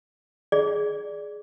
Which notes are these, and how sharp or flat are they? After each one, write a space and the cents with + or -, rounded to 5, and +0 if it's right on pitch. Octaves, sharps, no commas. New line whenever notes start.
G#4 +10 D5 +0